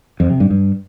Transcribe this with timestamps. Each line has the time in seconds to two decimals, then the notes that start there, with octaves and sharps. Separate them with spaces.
0.20 F2
0.30 C3
0.40 G2
0.51 G2